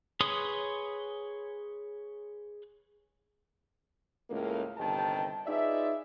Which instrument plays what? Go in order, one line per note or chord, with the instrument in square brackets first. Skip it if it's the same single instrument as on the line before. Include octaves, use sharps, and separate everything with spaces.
[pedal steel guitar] G#4 B4 C#5 C6 D#6
[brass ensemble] C#2 A2 A#3 F5
G1 C3 D#3 G5 A5
D#4 F4 G#4 B4 D5 E5